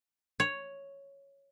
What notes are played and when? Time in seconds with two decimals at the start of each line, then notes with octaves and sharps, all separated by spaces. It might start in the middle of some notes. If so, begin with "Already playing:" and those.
0.40 C#5